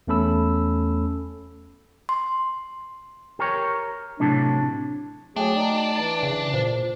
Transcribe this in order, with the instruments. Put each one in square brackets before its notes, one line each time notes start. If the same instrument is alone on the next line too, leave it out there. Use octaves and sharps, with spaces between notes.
[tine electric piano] E2 A3 C#4 A4 B5 E6
[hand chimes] C6
[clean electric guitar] G4 A#4 C#5
[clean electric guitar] A2 C3 F#3 [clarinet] D4
[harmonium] F#3 G#4 [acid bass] A3 [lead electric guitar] D4 [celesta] G5
[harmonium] D#4 D5
[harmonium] E3 D5 [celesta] A6
[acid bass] C#3
[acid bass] A#2 [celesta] C5